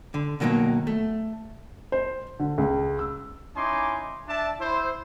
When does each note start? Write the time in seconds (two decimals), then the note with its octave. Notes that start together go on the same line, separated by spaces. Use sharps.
0.14 D3
0.40 B2 D#3 F#3 G3 A#3
0.87 A3
1.92 C5
2.39 D3
2.58 C#2
2.99 E6
3.56 C#4 D#4 E4 G#5 C6 D6
4.28 D4 D5 E5 A5
4.59 E4 C5